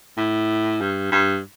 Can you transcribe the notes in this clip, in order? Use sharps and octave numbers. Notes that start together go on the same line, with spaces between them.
A2
G2
G2